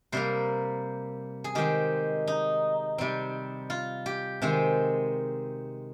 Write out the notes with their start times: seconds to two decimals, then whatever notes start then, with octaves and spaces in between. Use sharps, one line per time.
0.12 C3 G3 A#3 C5
1.44 G#4
1.55 D#3 G#3 C4 G4
2.27 D#4
2.98 C3 G3 C4
3.70 F4
4.06 G4
4.42 C3 D#3 G#3 C4